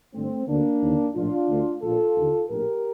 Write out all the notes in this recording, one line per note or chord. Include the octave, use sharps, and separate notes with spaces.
G1 G2 D3 A3 C4
D2 D3 A#3 D4
D#2 D3
A#1 A2 D4 F4
D2 D3
A#1 A#2 F4 A4
D#2 D3
A#1 A2 G4 A#4